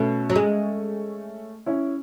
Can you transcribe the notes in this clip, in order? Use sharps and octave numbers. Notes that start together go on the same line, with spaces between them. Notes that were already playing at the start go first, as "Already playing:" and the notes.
Already playing: B2 A3 C#4
F#3
G#3
C#4 E4